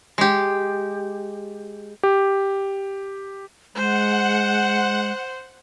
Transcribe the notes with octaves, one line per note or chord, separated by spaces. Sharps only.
G#3 G4
G4
G#3 C5 F#5